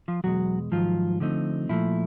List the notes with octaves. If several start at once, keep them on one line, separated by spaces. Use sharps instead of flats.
F3 F4
E2 B2 F#3 G#3 F#4
G#2 D#3 F3 F#3 F4
D3 F3 A3 C4 D#4
A#2 F3 A3 E4